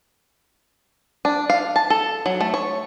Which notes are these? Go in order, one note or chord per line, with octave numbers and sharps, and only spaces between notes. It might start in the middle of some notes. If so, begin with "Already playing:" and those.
D4
F5
A5
A4
F#3
A3
C#5